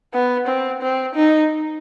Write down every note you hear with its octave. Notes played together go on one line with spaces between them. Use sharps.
B3
C4
C4
D#4